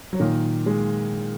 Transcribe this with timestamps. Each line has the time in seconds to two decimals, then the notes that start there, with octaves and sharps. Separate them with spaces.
0.13 F#3
0.20 A#2 D#3
0.66 G#3